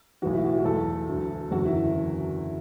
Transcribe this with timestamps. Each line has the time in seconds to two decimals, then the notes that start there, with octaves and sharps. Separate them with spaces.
0.22 B1 A2 E3 F#4
0.33 E4
0.44 F#4
0.58 F#4
0.65 E2 E3 A4
1.08 D2 D3 F#3
1.51 F#1 E2 D3 F#3 F#4
1.65 E4